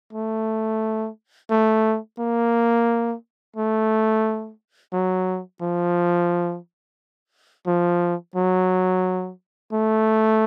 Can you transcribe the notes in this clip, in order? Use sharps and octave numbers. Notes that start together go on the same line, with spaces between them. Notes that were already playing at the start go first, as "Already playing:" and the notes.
A3
A3
A#3
A3
F#3
F3
F3
F#3
A3